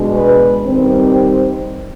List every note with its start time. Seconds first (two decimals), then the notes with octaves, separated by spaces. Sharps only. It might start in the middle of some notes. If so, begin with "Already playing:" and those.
Already playing: B2 G#3 D4
0.16 B4
0.66 D#3 G3 C4